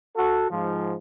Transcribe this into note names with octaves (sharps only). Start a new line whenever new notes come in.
F#4 A4
G#2 F3